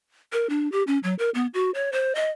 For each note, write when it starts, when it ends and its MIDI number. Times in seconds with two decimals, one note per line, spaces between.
0.33 0.49 70
0.49 0.70 62
0.72 0.83 67
0.87 0.99 61
1.03 1.15 54
1.19 1.30 70
1.35 1.47 59
1.54 1.71 66
1.74 1.90 73
1.92 2.15 72
2.15 2.31 75